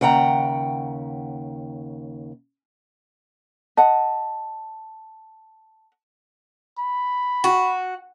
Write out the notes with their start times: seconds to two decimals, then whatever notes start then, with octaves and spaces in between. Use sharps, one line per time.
0.01 D#2 C#3 F#5 G5 A#5
3.77 D#5 F#5 A5
6.78 B5
7.44 F#4